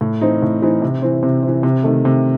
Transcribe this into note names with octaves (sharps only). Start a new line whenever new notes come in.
A2
E3 C4 D#4
A2
E3 C4 D#4
C3
E3 C4
C3
E3 C4
C3
D#3 A3
C3